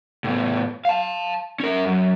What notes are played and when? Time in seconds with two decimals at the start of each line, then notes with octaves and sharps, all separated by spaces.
0.24 A2 B3
0.85 F5 A5
1.60 C#4 A#4
1.85 F#2